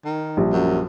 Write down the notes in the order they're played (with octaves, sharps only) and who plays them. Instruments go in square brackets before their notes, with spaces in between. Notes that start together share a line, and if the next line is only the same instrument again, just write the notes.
[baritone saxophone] D#3
[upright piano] A#1 G3
[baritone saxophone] F#2